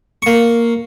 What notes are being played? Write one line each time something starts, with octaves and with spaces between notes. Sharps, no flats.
A#3 C#6